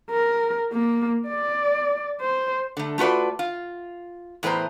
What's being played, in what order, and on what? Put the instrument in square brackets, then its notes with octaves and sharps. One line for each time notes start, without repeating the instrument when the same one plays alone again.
[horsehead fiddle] A#4
A#3
D5
C5
[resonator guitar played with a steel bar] D3 A3
A3 F4 F#4 B4 D5
F4
E2 A2 B4 C5 A#5